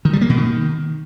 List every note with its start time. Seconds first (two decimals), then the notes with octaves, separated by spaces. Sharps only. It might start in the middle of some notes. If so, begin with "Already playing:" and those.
0.05 D#3
0.13 G3
0.21 A#3
0.29 B2
0.38 D#3